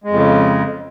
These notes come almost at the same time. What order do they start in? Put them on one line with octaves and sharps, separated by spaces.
G#3 F2 C#3